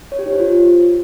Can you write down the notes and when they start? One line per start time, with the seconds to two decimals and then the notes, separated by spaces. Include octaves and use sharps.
0.12 C#5
0.19 G4
0.26 D#4
0.33 C5
0.40 F4